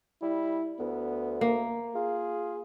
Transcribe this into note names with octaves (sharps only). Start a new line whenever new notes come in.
G3 E4
D2 B3
A#3
F4 G#4